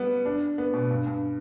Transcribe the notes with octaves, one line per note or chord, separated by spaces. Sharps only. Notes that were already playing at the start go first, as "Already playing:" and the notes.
Already playing: G3 B3
D4
B3
B2
G2
G2